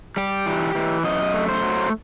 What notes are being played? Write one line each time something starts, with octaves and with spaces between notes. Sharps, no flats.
G3 G4
E3
E3
F#2 D#5
A3
C5
F#3